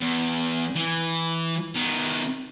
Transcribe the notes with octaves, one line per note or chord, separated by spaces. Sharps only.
E2
E3
D#3 B3